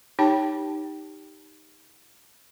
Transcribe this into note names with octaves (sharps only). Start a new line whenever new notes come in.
D#4 G4 C#5 G5 A5